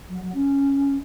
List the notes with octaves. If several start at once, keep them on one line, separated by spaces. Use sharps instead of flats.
F#3
F#3
C#4